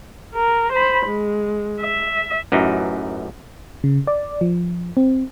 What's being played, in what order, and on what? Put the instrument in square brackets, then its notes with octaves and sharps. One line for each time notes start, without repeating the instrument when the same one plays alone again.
[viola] A#4
C5 B5
G#3
E5
[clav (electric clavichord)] A1 F#2 E3 D#4
[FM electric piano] C#3
D5
F3
C4